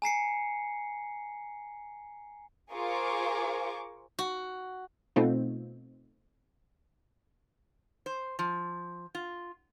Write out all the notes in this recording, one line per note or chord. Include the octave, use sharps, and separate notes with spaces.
G#5 A#5 C7 C#7
F4 G#4 A#4 C5 C#6 D6
F#4
B2 A3 C4 D#4 F4
C5
F3
F4